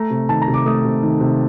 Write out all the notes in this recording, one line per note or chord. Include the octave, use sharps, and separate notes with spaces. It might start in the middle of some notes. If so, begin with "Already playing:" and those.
Already playing: A3 A#5
C3
D#3 A5
A#5
C3
D6
A3 D#6
C3
D#3
C3